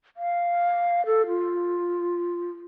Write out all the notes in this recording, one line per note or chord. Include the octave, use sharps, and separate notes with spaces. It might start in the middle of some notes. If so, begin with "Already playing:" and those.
F5
A4
F4